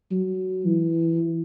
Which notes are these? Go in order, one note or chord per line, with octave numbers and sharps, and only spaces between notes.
F#3
E3